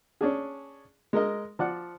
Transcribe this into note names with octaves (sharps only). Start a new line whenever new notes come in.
C#4 D4 G#4
G#3 A#4 D#5
F3 D5 F#5